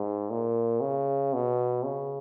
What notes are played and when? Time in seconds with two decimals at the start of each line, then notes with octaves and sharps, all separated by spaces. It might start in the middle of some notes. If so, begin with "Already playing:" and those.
Already playing: G#2
0.30 A#2
0.81 C#3
1.33 B2
1.85 C#3